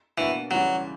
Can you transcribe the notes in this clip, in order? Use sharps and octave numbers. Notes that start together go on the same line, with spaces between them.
B2 E3 A#3 D4 F#4
C#2 C#3 E3 F#3 G3